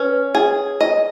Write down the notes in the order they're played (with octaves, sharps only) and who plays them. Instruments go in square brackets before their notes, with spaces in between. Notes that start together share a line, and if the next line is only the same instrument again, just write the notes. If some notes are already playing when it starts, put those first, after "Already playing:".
Already playing: [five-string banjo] C#4 [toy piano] B4
[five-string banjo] G#4
D#5